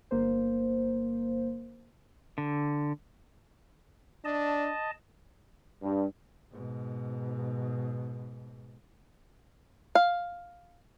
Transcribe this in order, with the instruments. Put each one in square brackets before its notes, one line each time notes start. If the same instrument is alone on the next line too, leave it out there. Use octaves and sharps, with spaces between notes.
[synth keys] G1 A#3 C5
[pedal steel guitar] D3
[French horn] D4 [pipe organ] D#5 A5
[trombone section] G2
[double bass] G#2 B2
[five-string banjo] F5